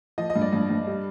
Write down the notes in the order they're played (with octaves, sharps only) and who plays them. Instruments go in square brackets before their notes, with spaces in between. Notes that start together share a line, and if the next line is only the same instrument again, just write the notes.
[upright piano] F3 D#5
D#5
G2
D5
G2
G2
G3